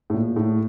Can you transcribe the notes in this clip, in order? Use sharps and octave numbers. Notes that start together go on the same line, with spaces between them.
A2
A#2
A2